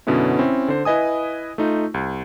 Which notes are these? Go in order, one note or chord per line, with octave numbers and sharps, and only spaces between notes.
F#2 B2 D3 B3 C#4 E4
C4 C#4 E4
D3 C5
E4 B4 D#5 G#5 D#6
A3 D#4 F4
C2